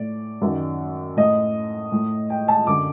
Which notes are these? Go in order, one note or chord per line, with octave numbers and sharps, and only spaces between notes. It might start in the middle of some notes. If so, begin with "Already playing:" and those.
Already playing: A2 D5
F#2 D#3
A2 D#5
A2
G5
A5
F#2 D3 D6